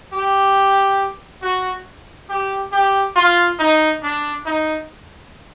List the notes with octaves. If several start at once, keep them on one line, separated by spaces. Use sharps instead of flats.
G4
F#4
G4
G4
F4
D#4
D4
D#4